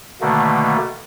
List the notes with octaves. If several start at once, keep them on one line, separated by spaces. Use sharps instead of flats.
B2 D3 D#3 A3 A#3